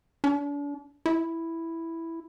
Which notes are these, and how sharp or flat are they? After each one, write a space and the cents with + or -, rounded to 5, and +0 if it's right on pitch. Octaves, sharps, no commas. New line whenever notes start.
D4 -40
E4 +0